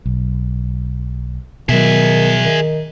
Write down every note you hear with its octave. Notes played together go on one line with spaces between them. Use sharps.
B1
B2 D#3 F#3 G#4 E5
D#3